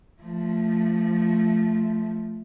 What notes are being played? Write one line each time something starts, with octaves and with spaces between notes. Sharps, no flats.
F3 A3